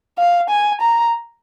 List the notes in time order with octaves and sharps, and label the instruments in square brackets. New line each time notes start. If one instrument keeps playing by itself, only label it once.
[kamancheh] F5
G#5
A#5